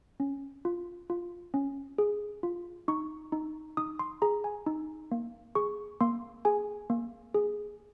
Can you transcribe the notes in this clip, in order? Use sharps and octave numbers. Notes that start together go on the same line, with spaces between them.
C#4
F4
F4
C#4
G#4
F4
D#4 C#6
D#4
D#4 D#6
C6
G#4 A#5
G#5
D#4
A#3
G#4 C#6
A#3 C6
G#4 G#5
A#3
G#4